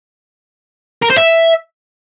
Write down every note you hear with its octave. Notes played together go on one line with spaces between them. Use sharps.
A#4
C5
E5